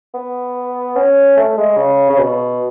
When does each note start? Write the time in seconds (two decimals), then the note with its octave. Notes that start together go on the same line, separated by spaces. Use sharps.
0.14 B3
0.96 C#4
1.37 A3
1.57 G#3
1.77 C#3
2.09 C#3
2.18 B2